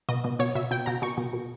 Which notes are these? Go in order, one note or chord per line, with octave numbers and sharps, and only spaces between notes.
B2 D#5
B2
B2 C#5
B2 E5
B2 G5
B2 A#5
B2 C#6
B2
B2